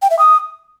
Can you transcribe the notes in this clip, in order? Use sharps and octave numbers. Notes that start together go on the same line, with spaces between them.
G5
E5
D#6